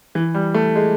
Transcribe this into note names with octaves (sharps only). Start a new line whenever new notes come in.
E3
G3
A3
G#3